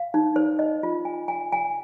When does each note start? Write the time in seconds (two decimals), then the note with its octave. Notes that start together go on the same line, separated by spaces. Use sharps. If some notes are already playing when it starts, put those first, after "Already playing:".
Already playing: F5
0.14 D#4
0.36 C5
0.59 D#5
0.83 F4
1.05 G#5
1.28 G#5
1.52 G#5